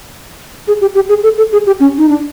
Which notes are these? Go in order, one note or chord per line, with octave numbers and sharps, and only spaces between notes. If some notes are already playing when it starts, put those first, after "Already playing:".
G#4
G4
G4
G#4
A4
A4
G#4
G4
C#4
D#4
D4